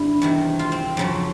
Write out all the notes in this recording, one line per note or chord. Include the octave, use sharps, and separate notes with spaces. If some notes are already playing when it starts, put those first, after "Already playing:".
Already playing: G2 D3 E4
E2 C3 D#3
F4
C4
F2 C#3 F#3